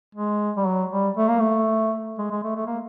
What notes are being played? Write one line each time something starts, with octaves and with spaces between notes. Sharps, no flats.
G#3
G3
F#3
G3
A3
A#3
A3
G#3
G#3
A3
A3
A#3